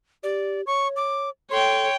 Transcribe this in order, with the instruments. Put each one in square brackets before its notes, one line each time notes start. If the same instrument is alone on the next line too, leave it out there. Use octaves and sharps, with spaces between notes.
[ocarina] G4 [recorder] D5
[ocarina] C#5 [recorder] C#6
[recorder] D6
[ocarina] A4 [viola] C#5 G5 [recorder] C6